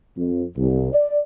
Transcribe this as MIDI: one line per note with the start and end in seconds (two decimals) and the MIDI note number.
0.16 0.44 41
0.57 0.93 36
0.93 1.17 74